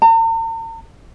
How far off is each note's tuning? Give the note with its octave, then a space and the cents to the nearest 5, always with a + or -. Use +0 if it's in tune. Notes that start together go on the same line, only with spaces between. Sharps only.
A#5 -45